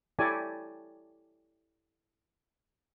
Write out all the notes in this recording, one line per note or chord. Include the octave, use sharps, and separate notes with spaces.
E4 G4 A4 C#5 D5 G#5